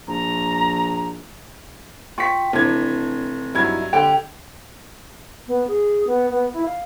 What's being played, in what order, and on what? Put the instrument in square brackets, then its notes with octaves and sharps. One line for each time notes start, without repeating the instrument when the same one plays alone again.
[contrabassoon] A#1 [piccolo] A#5
[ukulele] F4 G5 [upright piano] C#6 B6
[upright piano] F1 E3 G#6 [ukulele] D4
[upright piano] G2 F#3 G#6 [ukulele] D#4 E4
[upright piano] D3 [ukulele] G4 G5
[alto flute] B3
G#4
B3
B3
E4
F5